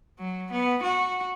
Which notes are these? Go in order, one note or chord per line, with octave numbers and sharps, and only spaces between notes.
F#3
B3
F#4